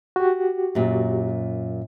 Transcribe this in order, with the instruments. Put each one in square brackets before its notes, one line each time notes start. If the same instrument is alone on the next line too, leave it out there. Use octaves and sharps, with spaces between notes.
[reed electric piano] F#4 G4
[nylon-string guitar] F#2 A#2